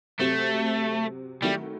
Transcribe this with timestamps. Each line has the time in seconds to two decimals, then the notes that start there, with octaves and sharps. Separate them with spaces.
0.19 C3 F#3 A3 C4
1.42 D#3 F#3 G3 A3 E4